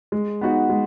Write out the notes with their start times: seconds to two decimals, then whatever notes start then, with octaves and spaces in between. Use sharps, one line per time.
0.12 G#3
0.41 B3 D#4 F#4
0.70 G#3